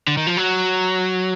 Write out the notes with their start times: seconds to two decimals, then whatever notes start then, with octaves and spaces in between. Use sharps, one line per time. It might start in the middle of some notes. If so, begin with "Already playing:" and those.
0.08 D3
0.17 D#3
0.27 F3
0.37 F#3